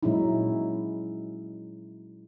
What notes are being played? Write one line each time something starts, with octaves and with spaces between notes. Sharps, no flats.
A#2 F#3 G#3 C#4 D#4 E4